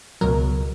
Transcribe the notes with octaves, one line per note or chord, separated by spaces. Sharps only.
C#2 B2 F#3 A#4